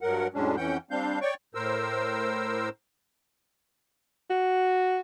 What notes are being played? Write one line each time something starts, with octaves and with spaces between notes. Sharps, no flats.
G2 F#3 A#4 F#5
F2 A2 F#3 G#3 C#4 D4
F2 E3 C#4 F#5 G5 G6
G3 C4 D4 F5 G6
C#5 D5 G5 C#6
A2 A#4 C5 E6
F#4